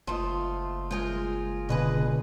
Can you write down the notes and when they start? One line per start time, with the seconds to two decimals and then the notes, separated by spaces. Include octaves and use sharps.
0.07 F#1 A3 F4 C5 D#5
0.91 G#3 F4 G#4 A#4 G6
1.69 C#2 B2 D3 G#4 B4 D#5